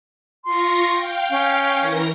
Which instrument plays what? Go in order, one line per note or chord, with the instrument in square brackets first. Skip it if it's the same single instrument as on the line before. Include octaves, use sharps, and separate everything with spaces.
[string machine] F4 C#6 A#6 [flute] C6
[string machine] F5 G5
[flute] C#4
[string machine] E3 A#4 A#6